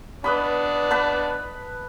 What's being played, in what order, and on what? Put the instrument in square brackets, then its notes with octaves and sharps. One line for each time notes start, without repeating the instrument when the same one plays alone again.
[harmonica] B3 D4 [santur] B4 D#5 B5
[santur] B4 A5 B5